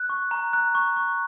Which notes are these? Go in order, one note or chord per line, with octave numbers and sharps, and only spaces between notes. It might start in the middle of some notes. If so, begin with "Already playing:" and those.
Already playing: F#6
C#6
A#5
F#6
C#6
C#6